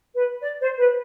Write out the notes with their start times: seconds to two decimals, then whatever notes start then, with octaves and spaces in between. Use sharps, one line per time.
0.14 B4
0.42 D5
0.60 C5
0.78 B4